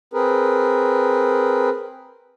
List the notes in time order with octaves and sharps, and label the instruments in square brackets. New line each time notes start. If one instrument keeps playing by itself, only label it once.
[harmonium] C4 G#4 A#4 B4